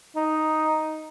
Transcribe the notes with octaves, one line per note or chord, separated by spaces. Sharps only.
D#4